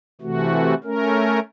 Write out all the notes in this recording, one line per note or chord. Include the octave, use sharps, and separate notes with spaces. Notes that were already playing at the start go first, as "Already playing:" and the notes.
C3 E3 A3 F#4
A3 C#4 A#4